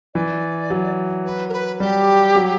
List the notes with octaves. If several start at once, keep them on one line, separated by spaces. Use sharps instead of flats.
E3 D5
F#3
B4
A#4
B4
G3 G4
F#3